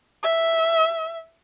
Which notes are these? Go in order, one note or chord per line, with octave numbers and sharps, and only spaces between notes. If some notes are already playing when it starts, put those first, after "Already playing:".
E5